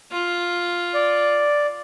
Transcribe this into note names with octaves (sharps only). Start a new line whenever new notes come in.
F4
D5